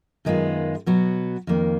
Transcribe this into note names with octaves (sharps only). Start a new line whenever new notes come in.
F#2 D#3 G#3 B3 F4
B2 F#3 B3 F#4
F2 D#3 A#3